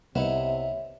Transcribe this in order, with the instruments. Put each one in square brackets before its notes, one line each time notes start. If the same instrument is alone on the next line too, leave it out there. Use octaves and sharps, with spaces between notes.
[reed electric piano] C2 [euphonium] C3 [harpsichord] B3 D#4 E4 [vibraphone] C#5 E5